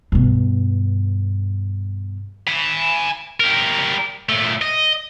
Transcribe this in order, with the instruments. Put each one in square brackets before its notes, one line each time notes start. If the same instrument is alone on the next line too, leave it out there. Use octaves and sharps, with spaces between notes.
[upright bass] G2 B2
[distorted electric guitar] G#5 B5
G3 A#4
A#2 A3
D#5